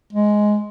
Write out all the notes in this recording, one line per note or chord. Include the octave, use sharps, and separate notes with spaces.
G#3